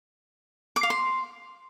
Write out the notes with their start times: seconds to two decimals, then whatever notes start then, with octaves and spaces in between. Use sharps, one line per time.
0.76 D6
0.83 F5
0.90 C6